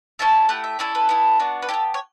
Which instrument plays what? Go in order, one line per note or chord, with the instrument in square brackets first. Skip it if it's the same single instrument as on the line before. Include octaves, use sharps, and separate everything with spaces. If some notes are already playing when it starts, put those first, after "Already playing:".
[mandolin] C#4 E4 A4 A5
A3 E4 G4 F#5
E5
C#4 E4 A4 D5
B4
B3 E4 A4
B3 D4 F#4
B4
E4 G4 A4
B3
C#5